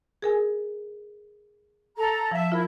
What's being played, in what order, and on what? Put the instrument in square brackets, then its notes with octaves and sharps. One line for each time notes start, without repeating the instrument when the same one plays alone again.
[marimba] G#4 A#4 G#5
[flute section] A4 A#5
[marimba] F3 A5 [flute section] E5
[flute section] E4 [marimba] F4 A#4